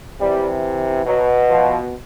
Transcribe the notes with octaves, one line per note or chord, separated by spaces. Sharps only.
C3 E3 G3
B2 F#3
F3